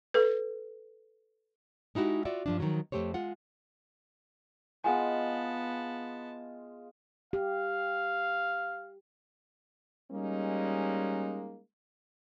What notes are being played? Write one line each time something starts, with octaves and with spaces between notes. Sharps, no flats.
A4 B4
G#3 D#4 E4 F#4 G4
F4 F#4 D5 E5 F#5
G2 F3 D4
D#3 F3 F#3
F2 D#3 A3 G4 C5 C#5
G#3 F4 F#5
G#3 B3 F4 D#5 F#5 G#5 A5
G4 F5
G3 G#3 A#3 C#4 D#4